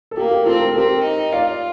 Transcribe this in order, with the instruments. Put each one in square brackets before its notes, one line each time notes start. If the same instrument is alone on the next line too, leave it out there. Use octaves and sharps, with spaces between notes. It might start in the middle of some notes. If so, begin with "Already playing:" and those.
[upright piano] A4
[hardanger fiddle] A#3 [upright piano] G4
[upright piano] G4
[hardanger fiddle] C4 [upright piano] F4 A4
[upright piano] A#4
A4
[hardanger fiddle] C4 [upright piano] G4 A#4
[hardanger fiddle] D#4
[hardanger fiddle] F4 [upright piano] D5 F5